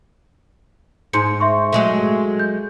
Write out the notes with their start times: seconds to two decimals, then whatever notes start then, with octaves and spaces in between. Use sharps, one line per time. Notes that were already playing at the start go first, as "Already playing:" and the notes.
1.13 G#2 D#4 C6 C#7
1.40 E5 C6 C#6
1.72 F#3 G#3 A3
2.39 G6